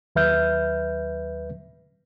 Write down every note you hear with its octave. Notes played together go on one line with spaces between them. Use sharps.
D#2 F#3 B4 E5 F6 G6